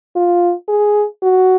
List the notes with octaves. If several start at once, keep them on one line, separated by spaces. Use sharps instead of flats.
F4
G#4
F#4